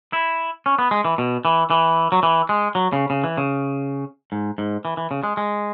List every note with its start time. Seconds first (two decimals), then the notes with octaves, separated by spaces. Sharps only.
0.13 E4
0.66 C#4
0.79 B3
0.91 G#3
1.05 E3
1.18 B2
1.45 E3
1.70 E3
2.12 F#3
2.23 E3
2.49 G#3
2.75 F#3
2.93 C#3
3.10 C#3
3.24 E3
3.38 C#3
4.32 G#2
4.58 G#2
4.85 E3
4.97 E3
5.11 C#3
5.24 G#3
5.37 G#3